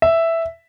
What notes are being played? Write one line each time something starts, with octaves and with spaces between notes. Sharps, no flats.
E5